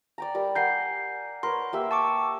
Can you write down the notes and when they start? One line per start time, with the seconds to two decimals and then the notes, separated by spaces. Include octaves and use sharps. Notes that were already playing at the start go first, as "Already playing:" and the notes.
0.18 D5 G5 A#5
0.35 G3 A#4
0.55 A#4 F#5 G#5 G6 C7
1.43 A#4 B4 C#5 C6
1.73 A#3 G4 E5
1.91 A5 C#6 D6